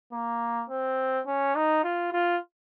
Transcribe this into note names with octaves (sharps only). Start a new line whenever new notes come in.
A#3
C4
C#4
D#4
F4
F4